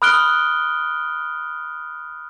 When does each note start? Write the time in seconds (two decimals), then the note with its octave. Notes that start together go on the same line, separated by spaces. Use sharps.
0.02 B5 D#6 F6 F#6 D7 G7